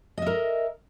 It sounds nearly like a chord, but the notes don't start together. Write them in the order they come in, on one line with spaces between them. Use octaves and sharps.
D#5 E5 A#4